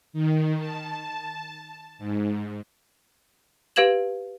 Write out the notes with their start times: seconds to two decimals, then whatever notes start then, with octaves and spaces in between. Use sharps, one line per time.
0.13 D#3
0.59 A5
1.99 G#2
3.76 G4 B4 F5 G#6 E7 F#7